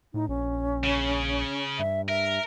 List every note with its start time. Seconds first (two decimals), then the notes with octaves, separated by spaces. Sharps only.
0.14 A2 D#4
0.29 A#1 C#4
0.84 C#3
1.79 G2 E5
2.09 A#4 E5